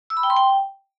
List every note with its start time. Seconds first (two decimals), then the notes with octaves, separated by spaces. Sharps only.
0.10 E6
0.17 B5
0.23 G5
0.30 C6
0.36 G5